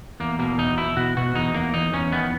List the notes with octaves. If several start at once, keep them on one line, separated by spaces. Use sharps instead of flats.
E2 A#3
B2 A#3
E2 D#4
B2 E4
B2 F#4
B2 F#4
E2 D#4
E2 A#3
E2 D#4
E2 C#4
D#3 B3